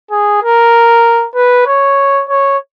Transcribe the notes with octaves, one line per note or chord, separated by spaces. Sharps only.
G#4
A#4
B4
C#5
C#5